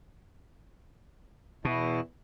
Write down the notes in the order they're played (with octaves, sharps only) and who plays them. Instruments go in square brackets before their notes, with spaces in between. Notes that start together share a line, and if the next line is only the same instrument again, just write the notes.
[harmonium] E2 E4 [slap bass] B2